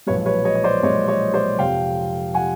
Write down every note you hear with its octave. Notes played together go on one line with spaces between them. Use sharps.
B1 A#2 F3 G#3 B4 C#5
B4 C#5
C#5 D#5
D#5
C5 D5
B1 A#2 F3 G#3 C#5 D#5
C#5 D#5
C5 D5
F1 F2 C3 F3 F5 G5
C3 F3 F#5 G#5